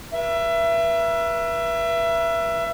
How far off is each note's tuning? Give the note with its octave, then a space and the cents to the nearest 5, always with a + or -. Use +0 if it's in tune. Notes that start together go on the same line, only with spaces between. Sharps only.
B4 -45 E5 +25